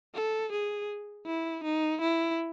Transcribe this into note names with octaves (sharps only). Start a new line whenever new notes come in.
A4
G#4
E4
D#4
E4